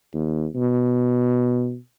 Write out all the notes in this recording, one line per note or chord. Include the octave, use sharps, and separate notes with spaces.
D#2
B2